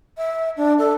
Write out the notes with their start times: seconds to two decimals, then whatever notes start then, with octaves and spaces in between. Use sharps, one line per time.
0.17 E5
0.56 D4
0.78 A4